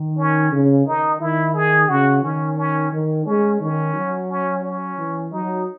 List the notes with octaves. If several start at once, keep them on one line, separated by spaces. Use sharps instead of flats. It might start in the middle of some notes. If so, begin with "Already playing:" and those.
Already playing: D#3
C#4
C#3
D#3 D#4
D#3 E4
G#4
C#3 F#4
D#3 C#4
C#4
D#3
G#3 C#4
D#3 C#4
F#3
C#4
C#4
E3
F#3 D#4